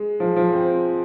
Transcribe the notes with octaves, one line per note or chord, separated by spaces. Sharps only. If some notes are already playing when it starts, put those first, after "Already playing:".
Already playing: G#3
F3
F3
C4